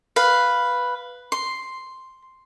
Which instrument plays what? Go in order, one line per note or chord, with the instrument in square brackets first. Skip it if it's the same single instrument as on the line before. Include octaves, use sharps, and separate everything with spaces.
[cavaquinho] B4 F5
C6